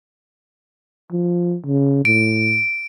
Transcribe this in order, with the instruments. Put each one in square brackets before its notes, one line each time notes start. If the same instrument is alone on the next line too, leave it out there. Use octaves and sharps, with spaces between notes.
[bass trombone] F3
C#3
[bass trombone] A2 [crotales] D7